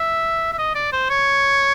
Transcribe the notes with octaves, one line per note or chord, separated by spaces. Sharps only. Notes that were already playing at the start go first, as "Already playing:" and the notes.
Already playing: E5
E5
D#5
D5
C5
C#5